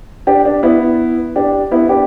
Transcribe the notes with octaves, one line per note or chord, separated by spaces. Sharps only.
D4 G4
D4
B3 E4
D4 G4
B3 E4
D4 G4